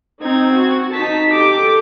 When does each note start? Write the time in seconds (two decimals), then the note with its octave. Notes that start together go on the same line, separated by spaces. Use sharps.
0.22 C4 D#4 G#6
0.52 F#4
0.95 D#4 A5 B6
1.33 G4 A4 D6